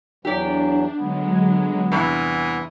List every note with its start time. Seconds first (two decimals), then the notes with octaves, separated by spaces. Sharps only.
0.25 E2 E3 F#3 D4 G4 D5
0.97 D3 F#3 G#3 B3
1.91 E2 G2 C3 E3 D#6